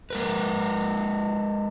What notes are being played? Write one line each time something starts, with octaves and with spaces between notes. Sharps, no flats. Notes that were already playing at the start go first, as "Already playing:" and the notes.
G#3 A#4 B4